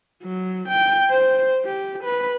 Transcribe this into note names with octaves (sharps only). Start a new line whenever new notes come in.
F#3
G5
C5
G4
B4